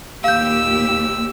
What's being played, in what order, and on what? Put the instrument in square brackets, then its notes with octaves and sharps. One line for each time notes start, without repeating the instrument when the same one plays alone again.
[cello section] D#2 A#2 G4 [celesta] F5 G6 [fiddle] E6